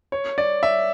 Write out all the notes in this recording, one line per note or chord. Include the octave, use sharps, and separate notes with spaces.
C#5
D5
E5